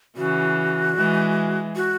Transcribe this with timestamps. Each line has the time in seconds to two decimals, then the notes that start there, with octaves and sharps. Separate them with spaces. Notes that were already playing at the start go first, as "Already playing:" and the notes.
0.16 C#3 E3 F#4
0.96 E3 G#3
1.76 F#4